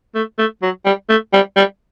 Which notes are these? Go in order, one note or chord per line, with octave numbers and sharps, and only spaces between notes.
A3
A3
F#3
G3
A3
G3
G3